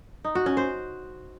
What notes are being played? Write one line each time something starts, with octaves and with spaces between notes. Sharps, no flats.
D#4
F#4
C#4
C5